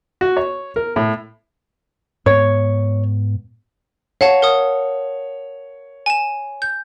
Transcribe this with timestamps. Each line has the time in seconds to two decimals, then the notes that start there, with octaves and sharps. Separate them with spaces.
0.21 F#4
0.37 C#5
0.76 A#4
0.96 A2
2.26 G#2 B3 C#5
4.21 C#5 F5 F#5 A5
4.42 A#4 F#5 D#6
6.06 G#5 E7
6.62 G6